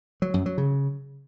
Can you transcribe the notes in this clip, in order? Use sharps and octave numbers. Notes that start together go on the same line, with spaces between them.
F#3
F#2
F#3
C#3